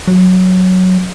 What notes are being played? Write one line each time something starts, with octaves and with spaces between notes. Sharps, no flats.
F#3